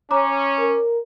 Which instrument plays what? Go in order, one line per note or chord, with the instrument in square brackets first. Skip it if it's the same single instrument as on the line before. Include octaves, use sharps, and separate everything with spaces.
[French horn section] C#4 [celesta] C#5 A#5 D6
[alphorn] A#4